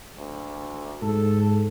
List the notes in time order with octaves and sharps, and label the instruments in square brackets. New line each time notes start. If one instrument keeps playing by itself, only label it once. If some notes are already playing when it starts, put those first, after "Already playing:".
[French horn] D2
[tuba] G#2 [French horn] A4